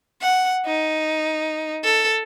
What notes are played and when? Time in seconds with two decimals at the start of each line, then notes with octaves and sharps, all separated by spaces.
0.22 F#5
0.66 D#4
1.84 A4